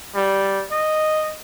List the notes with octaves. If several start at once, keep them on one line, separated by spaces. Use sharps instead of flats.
G3
D#5